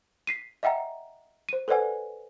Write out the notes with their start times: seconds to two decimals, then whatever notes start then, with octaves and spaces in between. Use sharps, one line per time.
0.27 B6 C7 D#7
0.63 D#5 E5 F#5 G5 A#5
1.49 C5 D#7
1.68 A4 B4 C5 D5 F#5 G#5